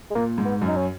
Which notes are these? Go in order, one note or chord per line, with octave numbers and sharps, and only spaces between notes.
G#3
A#2 A#3
G#2
B3
F#2
D#4
C#4